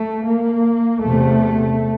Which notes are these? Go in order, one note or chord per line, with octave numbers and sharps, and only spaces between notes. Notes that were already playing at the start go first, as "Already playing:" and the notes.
Already playing: A3
A#3
E2 C3 A3